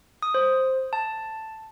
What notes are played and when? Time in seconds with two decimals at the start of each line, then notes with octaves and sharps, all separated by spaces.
0.22 D#6
0.34 C5
0.93 A5